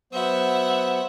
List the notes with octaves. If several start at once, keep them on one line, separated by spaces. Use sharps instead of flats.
F#3 B3 C5 E5 F#5